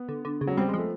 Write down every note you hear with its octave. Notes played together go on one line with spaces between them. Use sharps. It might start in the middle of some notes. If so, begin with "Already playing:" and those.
Already playing: B3
D3
D3
C#3
F#3
G3 C4
G#3
F3
A3